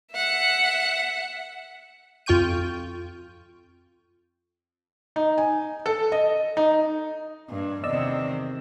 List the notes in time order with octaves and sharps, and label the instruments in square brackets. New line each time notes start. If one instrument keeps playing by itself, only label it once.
[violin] E5 F#5
[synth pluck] F2 F4 G5 C#6 G6 D#7
[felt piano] D#4
G#5
A4
D#5
D#4
[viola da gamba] G2 A#3
[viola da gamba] E2 C3 D#3 [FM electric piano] D5 D#5 E6